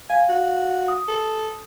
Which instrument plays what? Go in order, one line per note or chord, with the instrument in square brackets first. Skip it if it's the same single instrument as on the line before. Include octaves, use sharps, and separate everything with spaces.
[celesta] F5 [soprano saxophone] G#5
[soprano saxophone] F#4
[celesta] D#6
[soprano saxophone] A4